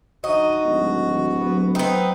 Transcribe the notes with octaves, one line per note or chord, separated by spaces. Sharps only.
D3 D#4 F#4 D#5
D1 D#3 G#3
F#3 B3
F#3 B3 C4 D#4